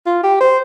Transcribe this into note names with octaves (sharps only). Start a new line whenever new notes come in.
F4
G4
C5